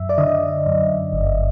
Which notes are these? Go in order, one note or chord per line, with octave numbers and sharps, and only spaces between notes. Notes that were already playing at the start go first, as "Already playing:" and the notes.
Already playing: F#2 E5
D5
D3 D#5
F#2
G1